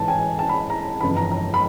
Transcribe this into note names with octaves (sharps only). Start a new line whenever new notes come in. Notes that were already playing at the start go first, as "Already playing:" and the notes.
Already playing: A1 G#2 E3 A5
G#5
A5
B5
A#5
G1 F2 C#3 E3 B5
A#5
A#5
B5